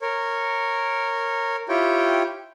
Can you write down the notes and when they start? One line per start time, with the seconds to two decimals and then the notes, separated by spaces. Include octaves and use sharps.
0.02 A#4 C#5
1.69 E4 F4 G4 C#5 G5